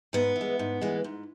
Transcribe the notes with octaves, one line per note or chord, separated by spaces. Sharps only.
G#2 B3
E3
G#3
G#2
E3 G#3
G#2